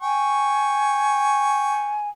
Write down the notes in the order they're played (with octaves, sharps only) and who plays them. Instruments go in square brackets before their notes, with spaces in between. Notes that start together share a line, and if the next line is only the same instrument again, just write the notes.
[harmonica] G5 C#6 [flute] G#5